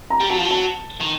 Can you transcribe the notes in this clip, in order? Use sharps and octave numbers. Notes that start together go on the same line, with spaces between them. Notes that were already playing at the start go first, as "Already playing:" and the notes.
A#5
G3
F#3 A5
F3
F#3
A5
D#3